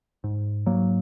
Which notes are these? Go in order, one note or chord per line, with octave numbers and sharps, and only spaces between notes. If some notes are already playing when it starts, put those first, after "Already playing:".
G#2
G#2 F#3 A#3